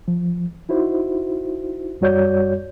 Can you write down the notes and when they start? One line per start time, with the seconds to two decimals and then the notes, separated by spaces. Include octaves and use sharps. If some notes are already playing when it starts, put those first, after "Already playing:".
0.08 F3
0.69 D#4 E4 F#4 C5
2.01 F#2 G3 F#4 C#5 D5 G6